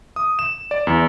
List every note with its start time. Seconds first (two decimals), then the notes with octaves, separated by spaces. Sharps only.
0.16 D#6
0.39 E7
0.71 D5
0.87 E2